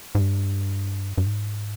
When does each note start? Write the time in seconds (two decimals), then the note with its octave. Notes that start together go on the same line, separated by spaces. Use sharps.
0.15 G#2
0.20 G2
1.18 G2
1.27 G#2